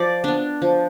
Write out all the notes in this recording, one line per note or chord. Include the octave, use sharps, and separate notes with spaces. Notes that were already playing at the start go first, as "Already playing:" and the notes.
Already playing: F3 D5
B3 D4
F3